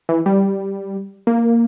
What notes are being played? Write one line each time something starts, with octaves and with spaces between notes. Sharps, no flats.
E3
G3
A#3